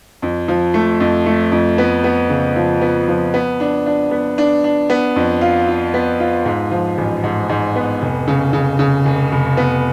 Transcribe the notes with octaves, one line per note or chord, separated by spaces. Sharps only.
F2
F3
A3
F2
A3
F2
B3
B3
C#3
F3
B3
F3
B3
D4
D4
B3
D4
D4
B3
F2
F4
F4
B3
F4
G#2
F3
A1
G#2
G#2
B3
F1
C#3
C#3
C#3
F1
F1
B3